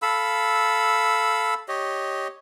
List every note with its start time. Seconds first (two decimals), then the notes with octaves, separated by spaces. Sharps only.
0.02 A4 F5 B5 E6
1.68 G4 C#5 D#5